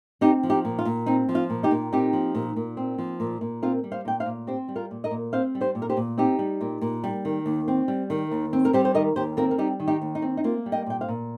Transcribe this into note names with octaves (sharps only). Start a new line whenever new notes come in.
C4 D#4 G4
F3
D#4 G4
A#2
F4
A#2
C4 D#4
F3
F4
A#2
D#4 G4
A#2
C4 D#4 G4
F3
A#2
A#2
C4
F3
A#2
A#2
C4 F4 A#4
G3
C5 F5
A#2 G5
C5 F5
A#2
C4 G4 C5
G3
F4 A#4
A#2
A#4 D#5
A#2
C4 C5 F5
G3
G4 C5
A#2
A#4
G4 C5
A#2
C4 D#4 G4
G3
A#2
A#2
G3
D#3
D#2
C4
G3
D#3
D#2
C4
A#4
G3 G4 C5
C5
D#3 A#4 D#5
D#2 G4 C5
C4 F4 A#4
A#4
G3 D#4 G4
D#3
D#4 G4
D#2
D#4
C4
D#4
A#3 F4
G3
D#5 G5
A#2 G5
C5 F5
A#2